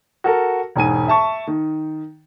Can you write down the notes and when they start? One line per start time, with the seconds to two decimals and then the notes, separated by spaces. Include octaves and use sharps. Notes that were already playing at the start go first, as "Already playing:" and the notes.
0.24 F#4 A4 A#4
0.76 E1 G#2 G#5 D#7
1.08 E5 A5 C#6
1.47 D#3